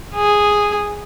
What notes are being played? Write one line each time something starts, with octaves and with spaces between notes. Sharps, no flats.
G#4